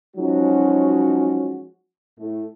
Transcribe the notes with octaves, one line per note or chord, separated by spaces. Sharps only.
F3 F#3 G#3 C#4 D#4 F#4
A2 A3